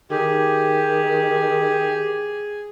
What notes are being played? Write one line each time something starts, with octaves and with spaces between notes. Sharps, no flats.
D#3 G4 G#4